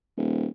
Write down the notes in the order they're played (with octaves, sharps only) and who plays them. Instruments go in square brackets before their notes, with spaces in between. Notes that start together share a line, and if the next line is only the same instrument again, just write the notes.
[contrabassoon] D#1